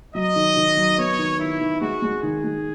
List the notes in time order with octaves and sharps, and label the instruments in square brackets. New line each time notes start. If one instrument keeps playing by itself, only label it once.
[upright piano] F#3 [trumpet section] D#5
[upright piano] D#3
D#3
F#3
[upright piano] B3 [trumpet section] C#5
[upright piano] D#3
[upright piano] D#3 [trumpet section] E4
[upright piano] D#3
[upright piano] G#3 [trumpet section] F#4
[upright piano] G#3
[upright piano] D#3 [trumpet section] G#4
[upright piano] G#3